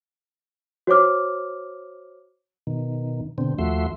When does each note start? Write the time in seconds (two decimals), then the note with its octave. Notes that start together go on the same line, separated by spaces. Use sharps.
0.87 F#4 C5 C#5 D6 F6
2.67 B2 D#3
3.38 B2 D3 C4
3.58 D#2 F3 A3 F#4 E5 C6